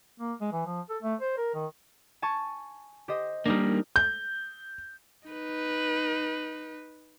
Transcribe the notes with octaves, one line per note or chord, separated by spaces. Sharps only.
A#3
G#3
E3
F3
A4
A3
C5
A#4
D#3
G#5 A5 C#6
G4 C5 D#5
G3 A#3 D4 D#4 A#4
G6
D#4 B4